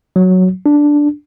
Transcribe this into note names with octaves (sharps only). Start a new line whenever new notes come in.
F#3
D4